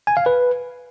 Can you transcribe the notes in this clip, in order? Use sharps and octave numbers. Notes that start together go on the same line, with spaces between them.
G#5
F5
B4